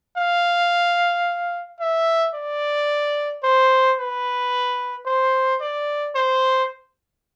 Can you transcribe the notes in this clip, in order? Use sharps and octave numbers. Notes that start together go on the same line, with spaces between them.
F5
E5
D5
C5
B4
C5
D5
C5